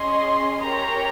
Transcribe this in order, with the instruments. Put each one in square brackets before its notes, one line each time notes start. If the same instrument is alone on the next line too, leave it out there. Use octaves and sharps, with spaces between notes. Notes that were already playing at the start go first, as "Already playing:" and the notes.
Already playing: [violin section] C#4 G#4 D#5 [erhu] C6
[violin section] G4 A#4 C#5 [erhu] A#5